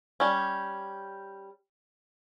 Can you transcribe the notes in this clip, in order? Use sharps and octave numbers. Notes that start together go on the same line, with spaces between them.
G3 C#4